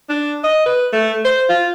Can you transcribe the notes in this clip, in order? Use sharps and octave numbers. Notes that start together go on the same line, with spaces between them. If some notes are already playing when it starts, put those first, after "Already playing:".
D4
D#5
B4
A3
C5
F4